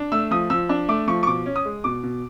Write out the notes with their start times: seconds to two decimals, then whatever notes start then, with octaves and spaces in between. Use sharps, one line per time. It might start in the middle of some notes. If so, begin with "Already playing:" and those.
Already playing: D4
0.12 A3 E6
0.31 F3 D#6
0.50 F3 E6
0.69 D4
0.89 A3 D6
1.08 F3 C#6
1.23 C#6
1.27 B2 D6
1.46 C#4
1.56 D#6
1.65 G#3
1.84 B2 D6
2.03 B2